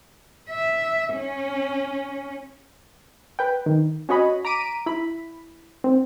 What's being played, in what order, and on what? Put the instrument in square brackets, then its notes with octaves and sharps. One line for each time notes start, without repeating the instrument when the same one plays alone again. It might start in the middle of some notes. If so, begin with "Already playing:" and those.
[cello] E5
C#4
[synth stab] B4 G5
D#3
C#4 F#4 C#5 D#5 B5
A#5 D6 B6 D7 D#7
E4 B5
C4